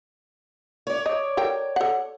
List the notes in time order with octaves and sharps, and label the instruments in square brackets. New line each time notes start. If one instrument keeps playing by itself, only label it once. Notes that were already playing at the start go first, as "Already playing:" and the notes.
[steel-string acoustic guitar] C#5 D5
[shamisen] D#5
A4 A#4 G5
A4 F#5